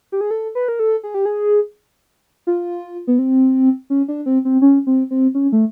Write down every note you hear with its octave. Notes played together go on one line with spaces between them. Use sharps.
G4
G#4
A4
B4
A#4
A4
G#4
G4
G#4
F4
B3
C4
C#4
D4
C4
C4
C#4
C4
C4
C#4
A3